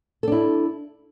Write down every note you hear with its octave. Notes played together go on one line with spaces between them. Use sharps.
D4 E4 A4